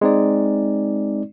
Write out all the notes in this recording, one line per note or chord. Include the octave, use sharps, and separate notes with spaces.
G#3 C4 D#4 D5